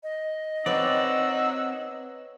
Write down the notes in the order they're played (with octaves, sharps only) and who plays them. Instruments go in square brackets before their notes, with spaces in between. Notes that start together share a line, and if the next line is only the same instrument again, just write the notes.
[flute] D#5
[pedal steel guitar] C4 D5 [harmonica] D#4 F#5 E6 [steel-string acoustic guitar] B4 C#5